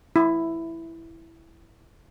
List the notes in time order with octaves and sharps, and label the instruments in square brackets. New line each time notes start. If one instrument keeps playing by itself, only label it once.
[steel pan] E4